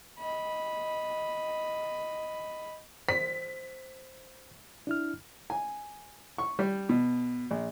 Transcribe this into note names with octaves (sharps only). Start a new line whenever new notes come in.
D#5 B5
C5 B6
D4 E4 F6
G#5
C#6
G3
B2
A#1